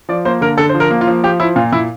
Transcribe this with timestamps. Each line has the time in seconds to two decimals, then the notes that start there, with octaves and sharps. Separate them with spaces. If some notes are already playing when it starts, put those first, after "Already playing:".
0.09 F3 D5
0.25 A#3 C5
0.41 D3 A#4
0.58 D3 A4
0.69 C5
0.74 F3
0.80 A#4
0.91 A#3
1.01 F4
1.07 F3
1.23 F3 G4
1.40 F3 E4
1.56 A#2 F4
1.72 A#2 E4